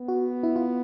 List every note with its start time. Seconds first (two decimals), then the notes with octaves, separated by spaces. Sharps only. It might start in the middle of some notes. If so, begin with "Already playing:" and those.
Already playing: B3
0.08 F#4
0.43 E4
0.56 F4